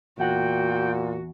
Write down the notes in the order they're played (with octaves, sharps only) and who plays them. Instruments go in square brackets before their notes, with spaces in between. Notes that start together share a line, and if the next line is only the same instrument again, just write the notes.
[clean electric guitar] E2 F#5 [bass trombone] A#2 [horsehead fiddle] F#4 [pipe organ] G5